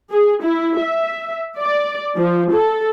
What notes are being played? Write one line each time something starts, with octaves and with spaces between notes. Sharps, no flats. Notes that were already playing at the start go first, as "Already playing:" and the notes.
G#4
E4
E5
D5
F3
A4